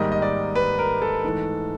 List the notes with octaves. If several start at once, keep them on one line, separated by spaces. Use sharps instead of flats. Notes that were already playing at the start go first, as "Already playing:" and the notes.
Already playing: G#2 D#3 G3 A#3 D#5
D#5
D5
B4
A#4
A4
G#2 E3 A3